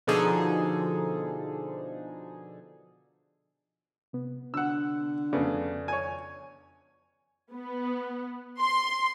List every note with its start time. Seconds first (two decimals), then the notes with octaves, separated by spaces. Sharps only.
0.07 B2 D3 F3 D#4 G#4 A4
4.13 C3 B3
4.54 D3 F#5 E6
5.33 F2 C#3 A3 B3 D5
5.88 C#5 G#5
7.53 B3
8.61 C6